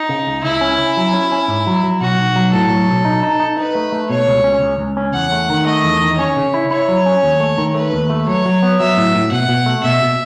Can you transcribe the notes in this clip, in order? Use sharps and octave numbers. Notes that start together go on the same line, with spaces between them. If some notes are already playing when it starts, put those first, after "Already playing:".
Already playing: D#4
C#3
C#2
C#2 E4
C#4
C#4
F#3
C#4
C#4
G#2
F#3
F#3
B1 F#4
B1
F#3
A2 A4
F#3
B1
D#4
D#4
D#4
D#4 B4
A3
A3
B2 C#5
C#2
C#4
C#2
C#2
C#4
E2 F#5
A3
D#3
A3 D#5
E2
D#3
C#4 C#5
C#3
E4
E4 C#5
F#3
C#4
D#2
A3
D#3
A3 B4
D#2
A3
F#3 C#5
F#3
B3
F#3 E5
A2
A2
B2 F#5
B2
A3
B2 E5
B2